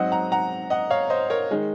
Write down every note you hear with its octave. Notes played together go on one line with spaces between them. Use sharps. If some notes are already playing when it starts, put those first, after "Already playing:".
Already playing: G#2 F#3 C4 D#5 F#5
F#5 A#5
F#5 A#5
D#5 F#5
C#5 F5
C5 D#5
A#4 C#5
D#3 G#3